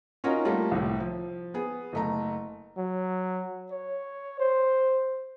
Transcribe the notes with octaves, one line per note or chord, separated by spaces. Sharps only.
C#4 D#4 F4 F#4 A#4 C#5
G3 A3 A#3 F4
C2 A2
F3
B3 G#4
F#1 A3 A#5
F#3
C#5
C5